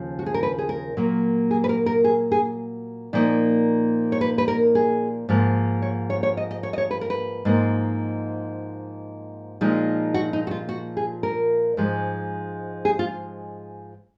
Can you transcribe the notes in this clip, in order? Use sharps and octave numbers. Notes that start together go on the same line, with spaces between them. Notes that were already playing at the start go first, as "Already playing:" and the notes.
Already playing: D#2 C#3 F3
F#4
G#4
A#4
B4
G#4
A#4
A#2 F#3 A#3
G#4
B4
A#4
A#4
G#4
G#4
A#2 F3 A#3 D#4
C#5
B4
B4
A#4
G#4
G#2 F3 A#3
C#5
C#5
C#5
D#5
D#5
C#5
D#5
C#5
B4
A#4
B4
G#2 F3 A#3
A#2 F3 G#3 D#4
F#4
D#4
F#4
F4
F#4
G#4
A#4
G#2 F3 G#3
G#4
F4